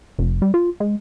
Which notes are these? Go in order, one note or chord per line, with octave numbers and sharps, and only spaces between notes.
F1
G3
F4
G#3